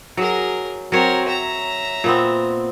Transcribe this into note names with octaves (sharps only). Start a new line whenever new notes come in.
F#3 G#4 A#4
F#3 C4 A#4 C#5
E5 A#5
A#2 B3 C4